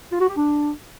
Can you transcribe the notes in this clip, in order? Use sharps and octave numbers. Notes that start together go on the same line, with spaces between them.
F4
F#4
G4
D4